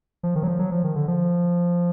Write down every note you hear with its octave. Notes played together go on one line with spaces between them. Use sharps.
F3
D#3
F#3
F3
F#3
F3
D#3
D3
F3